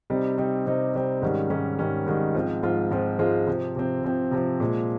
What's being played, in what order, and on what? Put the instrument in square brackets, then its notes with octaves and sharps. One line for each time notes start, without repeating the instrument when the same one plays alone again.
[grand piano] C3 G3 C4 D#4
C3 G3 C4 D#4
C3 G3 C4 D#4
C3 G3 C4 D#4
G#2 D#3 G3 C#4
G#2 D#3 G3 C#4
G#2 D#3 G3 C#4
G#2 D#3 G3 C#4
G#2 F3 G#3 C4 F4
G#2 F3 G#3 C4 F4
G#2 F3 G#3 C4 F4
G#2 F3 G#3 C4 F4
C3 F3 C4
C3 F3 C4
C3 F3 C4
C3 F3 C4
A#2 F3 G#3